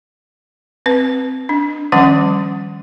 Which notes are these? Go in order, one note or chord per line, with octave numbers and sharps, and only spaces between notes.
C4 B4
D4
D#3 F3 G3 C#4 F#5